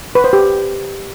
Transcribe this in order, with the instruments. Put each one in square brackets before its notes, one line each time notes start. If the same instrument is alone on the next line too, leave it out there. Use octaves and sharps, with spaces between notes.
[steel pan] B4
C5
G4